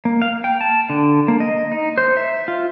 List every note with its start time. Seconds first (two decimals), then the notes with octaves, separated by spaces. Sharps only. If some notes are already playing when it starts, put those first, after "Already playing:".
0.05 A#3
0.22 F5
0.44 G5
0.61 A5
0.90 D3
1.28 A#3
1.40 D#5
1.72 D#4
1.98 C5
2.17 E5
2.48 F4